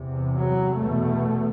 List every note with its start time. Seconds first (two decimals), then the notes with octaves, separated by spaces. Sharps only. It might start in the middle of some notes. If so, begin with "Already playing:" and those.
Already playing: E2 C3
0.36 F#3
0.79 E2 B2 A3